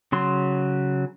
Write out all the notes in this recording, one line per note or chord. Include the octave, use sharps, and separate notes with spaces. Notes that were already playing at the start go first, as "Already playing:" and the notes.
C#3 F#3 C6